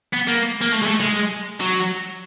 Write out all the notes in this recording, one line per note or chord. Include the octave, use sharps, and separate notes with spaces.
B3
A#3
A#3
A3
G#3
A3
G#3
F#3